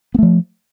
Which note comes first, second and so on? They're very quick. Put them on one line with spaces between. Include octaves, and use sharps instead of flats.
B3 A3 F3